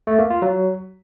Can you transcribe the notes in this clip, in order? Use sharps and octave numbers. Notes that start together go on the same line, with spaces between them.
A3
A#3
F4
F#3